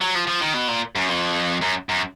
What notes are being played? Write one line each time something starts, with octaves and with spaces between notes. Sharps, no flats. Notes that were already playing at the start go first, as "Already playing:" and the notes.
F#3
F3
F3
D#3
B2
A#2
F#2
F2
F#2
F#2